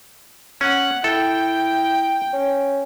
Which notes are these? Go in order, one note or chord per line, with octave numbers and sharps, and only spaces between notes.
C#4 F#5
E4 A4 G5
C#4